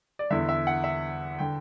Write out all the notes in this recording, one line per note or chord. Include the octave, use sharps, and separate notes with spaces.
D5
E2 D3 E5
E5
F#5
E5
D3 G5